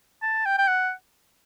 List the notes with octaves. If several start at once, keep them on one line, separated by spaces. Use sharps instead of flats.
A5
G5
G5
F#5